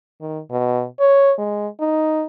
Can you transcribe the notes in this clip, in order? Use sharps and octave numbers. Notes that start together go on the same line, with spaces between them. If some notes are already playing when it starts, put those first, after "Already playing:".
D#3
B2
C#5
G#3
D#4